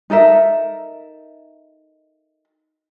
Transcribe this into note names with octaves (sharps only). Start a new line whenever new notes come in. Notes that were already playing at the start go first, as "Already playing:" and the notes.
D#4 A4 A#4 E5